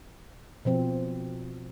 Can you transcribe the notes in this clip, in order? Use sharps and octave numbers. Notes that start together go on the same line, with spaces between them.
B2 F3 C4